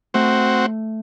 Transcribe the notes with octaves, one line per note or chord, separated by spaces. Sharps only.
A3 C4 F#4